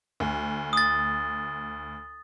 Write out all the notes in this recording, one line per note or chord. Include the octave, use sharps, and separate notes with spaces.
D2
D#6 A6